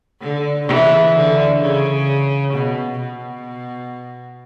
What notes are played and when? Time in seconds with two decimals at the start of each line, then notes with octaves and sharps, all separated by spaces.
0.21 D3
0.68 C#3 E3
1.15 D3
1.61 C#3
2.54 B2
3.00 B2